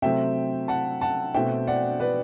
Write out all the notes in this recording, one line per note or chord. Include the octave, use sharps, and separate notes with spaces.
C3 F#3 A3 C4 E5 G5
F#5 A5
F#5 A5
B2 A3 C4 E5 G5
D5 F#5
B4 D5